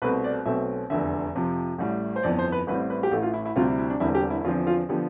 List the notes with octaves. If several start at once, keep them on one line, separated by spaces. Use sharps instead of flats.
C2 B2 A3 C4 B4
D5
B1 B2 A3 C4 E5
F1 E2 D3 E5
F2 C3 F3
A1 A2 G3
C5
G1 F2 E3 B3 D5
C5
B4
A1 A2 G3 C4 B4
B4
G4
A1 A2 E3 A4
F4
E4
E4
D2 C3 G3 C4 F4
E4
E4
D4
E1 E2 D3 G3 C4 E4
G4
E4
E4
E2 D3 F3 C4 F4
F4
D3 F3 B3 G4